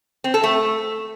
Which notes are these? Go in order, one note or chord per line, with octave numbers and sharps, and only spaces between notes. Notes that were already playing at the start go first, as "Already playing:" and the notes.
C4
A4
A3